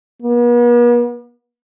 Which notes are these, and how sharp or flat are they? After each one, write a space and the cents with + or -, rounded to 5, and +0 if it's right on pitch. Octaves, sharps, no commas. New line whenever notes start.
B3 -45